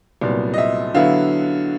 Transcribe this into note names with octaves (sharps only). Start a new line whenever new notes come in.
C2 A#2 F#3 B3 D5
D#5
E5
D3 F#3 B3 E4 F5